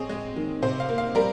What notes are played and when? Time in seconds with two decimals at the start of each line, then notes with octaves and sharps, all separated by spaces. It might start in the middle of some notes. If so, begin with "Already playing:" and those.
Already playing: C4 G#4 C#5 D#5
0.09 G#3
0.36 D#3
0.62 C3 C5
0.80 F5
0.89 A#3
0.98 F5
1.15 G3 A#4